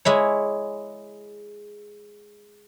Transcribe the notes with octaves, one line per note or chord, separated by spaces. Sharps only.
G#3 E4 C#5